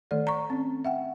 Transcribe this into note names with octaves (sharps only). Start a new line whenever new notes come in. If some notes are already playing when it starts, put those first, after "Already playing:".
D#3 A3 A4 D5
A#5 C#6
C4 C#4
E5 F#5 G5